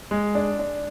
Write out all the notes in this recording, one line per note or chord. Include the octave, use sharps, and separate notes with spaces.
G#3
D4
D4